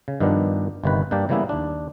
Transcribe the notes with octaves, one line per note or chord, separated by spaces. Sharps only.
C#3
G2 D#3 F3 B3 D4
G1 C3 D#3 B4
G2 A#3 D4 G4 D5
C#3 E3 G3 A#3 B3 E4
D#2 D4